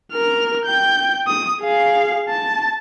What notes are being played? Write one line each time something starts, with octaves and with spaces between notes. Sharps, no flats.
A#4 F6
G5 G6
D#6
G#4 F5
A5